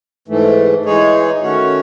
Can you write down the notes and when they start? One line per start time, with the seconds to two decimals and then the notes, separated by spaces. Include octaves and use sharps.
0.28 G#2 E3 A3
0.85 E3 G#3 D#4 G#4 C#5
1.42 D#3 A3 C#4 F#4 C#5